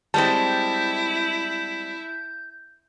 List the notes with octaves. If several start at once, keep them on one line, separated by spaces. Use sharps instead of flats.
G3 G#3 C4 E4 A5 G6